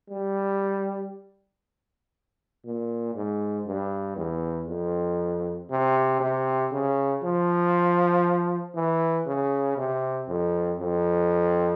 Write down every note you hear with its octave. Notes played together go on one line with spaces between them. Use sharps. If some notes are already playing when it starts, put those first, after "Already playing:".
G3
A#2
G#2
G2
E2
F2
C3
C3
C#3
F3
E3
C#3
C3
F2
F2